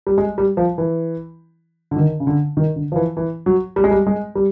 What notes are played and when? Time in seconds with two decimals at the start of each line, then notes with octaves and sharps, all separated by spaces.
0.07 G3
0.18 G#3
0.38 G3
0.57 F3
0.78 E3
1.91 D3
1.96 D#3
2.20 C#3
2.27 D3
2.57 D#3
2.76 D3
2.92 F3
2.96 E3
3.17 E3
3.46 F#3
3.76 G3
3.84 G#3
3.91 G3
4.07 G#3
4.35 G3